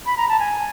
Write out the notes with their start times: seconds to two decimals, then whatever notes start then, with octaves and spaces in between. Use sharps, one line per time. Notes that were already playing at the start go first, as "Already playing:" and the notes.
0.06 B5
0.17 A#5
0.29 A5
0.39 G#5